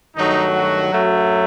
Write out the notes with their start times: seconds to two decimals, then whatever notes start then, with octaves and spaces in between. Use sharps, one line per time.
0.16 G2 D#3 F#3 A3 D#4
0.54 F#4
0.92 F#2 F#3 A3